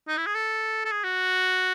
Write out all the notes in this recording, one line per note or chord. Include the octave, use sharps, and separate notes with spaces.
D#4
E4
G#4
A4
A4
G#4
F#4